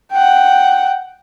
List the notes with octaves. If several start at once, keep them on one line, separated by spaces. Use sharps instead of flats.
F#5 G5